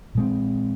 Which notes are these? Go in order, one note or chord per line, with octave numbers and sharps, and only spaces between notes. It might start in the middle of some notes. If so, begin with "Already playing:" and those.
A#2 G#3 C4